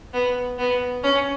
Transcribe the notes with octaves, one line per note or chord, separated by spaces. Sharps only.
B3
B3
C#4